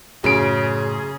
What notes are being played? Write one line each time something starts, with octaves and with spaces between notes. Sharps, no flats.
F#2 A2 C#3 G#4 D7